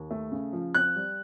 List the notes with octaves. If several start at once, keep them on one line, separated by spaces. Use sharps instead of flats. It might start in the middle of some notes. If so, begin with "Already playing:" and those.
Already playing: D#2
A3
C#3
F3
C4 F#6
G3